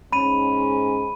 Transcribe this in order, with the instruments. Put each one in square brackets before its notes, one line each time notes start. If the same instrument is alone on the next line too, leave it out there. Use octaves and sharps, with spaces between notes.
[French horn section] G#2 C#4 [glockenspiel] B5 D#7